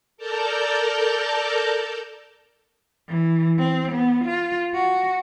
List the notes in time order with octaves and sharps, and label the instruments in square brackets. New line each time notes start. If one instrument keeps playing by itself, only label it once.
[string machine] A4 A#4 D5 A5 A#5 G6
[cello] E3
C4
B3
F4
F#4